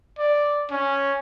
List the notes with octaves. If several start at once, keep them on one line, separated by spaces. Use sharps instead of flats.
D5
C#4